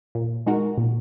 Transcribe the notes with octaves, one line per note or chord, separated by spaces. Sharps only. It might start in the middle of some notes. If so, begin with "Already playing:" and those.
A#2
G#3 D#4 F#4 A#4
A#2